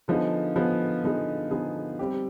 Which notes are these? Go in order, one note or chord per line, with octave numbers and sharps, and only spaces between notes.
D3 F3 B3 D#4 G#4
D3 F3 B3 D#4 G#4
D3 F3 B3 D#4 G#4
D3 F3 B3 D#4 G#4
G3 C4 G4